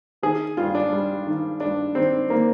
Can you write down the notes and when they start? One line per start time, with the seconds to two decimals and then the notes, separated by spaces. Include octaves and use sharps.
0.23 D#3 G#4
0.57 G2 F4
0.75 D4
0.93 G3
1.27 D#3
1.60 G2 D4
1.95 D#3 C4
2.30 D#3 A#3